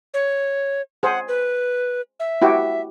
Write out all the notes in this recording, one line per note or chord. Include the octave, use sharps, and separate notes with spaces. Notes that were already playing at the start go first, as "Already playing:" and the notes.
C#5
G#4 C5 F#5
B4
E5
E4 F#4 G4